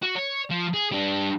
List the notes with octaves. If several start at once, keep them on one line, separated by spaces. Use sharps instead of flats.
F#4
C#5
F3
G#4
G3 D4